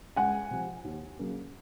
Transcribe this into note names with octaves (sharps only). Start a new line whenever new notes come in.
C#2 F#5 G#5
C3 F3
D#2
C#3 F#3 A#3 C#4